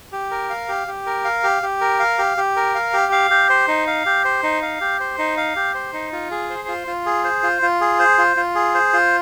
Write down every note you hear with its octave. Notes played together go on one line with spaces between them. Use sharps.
G4
A#4
F5
G4
G4
A#4
F5
G4
G4
A#4
F5
G4
G4
A#4
F5
G4
F5
G4
C5
D#4
F5
G4
C5
D#4
F5
G4
C5
D#4
F5
G4
C5
D#4
F4
G#4
C5
F4
F4
G#4
C5
F4
F4
G#4
C5
F4
F4
G#4
C5
F4